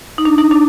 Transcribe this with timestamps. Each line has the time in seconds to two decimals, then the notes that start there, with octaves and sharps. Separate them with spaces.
0.18 D#4
0.25 D4
0.38 D#4
0.51 D4